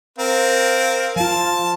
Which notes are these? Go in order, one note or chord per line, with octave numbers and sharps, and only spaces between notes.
C4 A#4 F5
F3 F4 A5